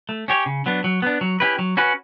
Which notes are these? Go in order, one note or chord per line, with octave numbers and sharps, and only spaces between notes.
A3
C#4 G4 C#5
C#3
F#3 B3 D4
F#3
B3 D4
F#3
C#4 E4 G4 B4
F#3
C#4 F#4 B4